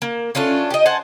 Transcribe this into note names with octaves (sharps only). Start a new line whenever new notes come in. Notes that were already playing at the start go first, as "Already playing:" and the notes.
A#3
A3 C#4 D4 F4
G4 D#5
C5 F#5 G#5 A5